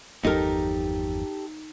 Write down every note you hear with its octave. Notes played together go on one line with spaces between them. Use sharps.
G1 E2 F3 D#4 G4 A4 A#4